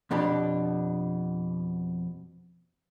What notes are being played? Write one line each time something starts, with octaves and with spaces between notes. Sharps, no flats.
F2 B2 D4 G4 B5